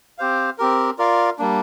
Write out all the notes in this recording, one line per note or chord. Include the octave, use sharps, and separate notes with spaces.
C4 G4 C5 F5
C4 G4 A#4
F4 A#4 D5 F5
G3 A#3 D4